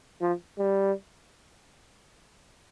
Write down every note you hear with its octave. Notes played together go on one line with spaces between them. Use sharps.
F3
G3